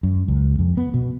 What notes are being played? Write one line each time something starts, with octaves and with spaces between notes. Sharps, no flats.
F#2
C#2
F2
B3
B2